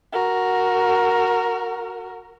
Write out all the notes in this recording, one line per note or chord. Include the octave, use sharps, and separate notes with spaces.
F#4 A#4